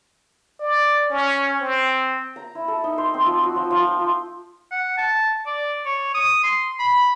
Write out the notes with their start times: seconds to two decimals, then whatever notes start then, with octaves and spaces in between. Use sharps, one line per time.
0.59 D5
1.10 C#4
1.61 C4
2.36 A#5
2.55 E4
2.68 A4
2.84 D#4
2.98 C5
3.14 C4
3.25 F3
3.43 F#4
3.56 F3
3.70 F3
3.87 G5
4.00 F4
4.71 F#5
4.98 A5
5.46 D5
5.86 C#5
6.15 D#6
6.43 C6
6.79 B5